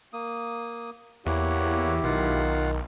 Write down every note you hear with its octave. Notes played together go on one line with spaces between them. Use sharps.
A#3 D#6
E2 A#3 E4 G4 C#5 F#5
B1 D#3 F4 F5 F#5